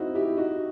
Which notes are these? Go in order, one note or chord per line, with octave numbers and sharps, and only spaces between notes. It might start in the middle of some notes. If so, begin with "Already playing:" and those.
Already playing: C4 D#4 E4 F#4
E4 G4
D#4 F#4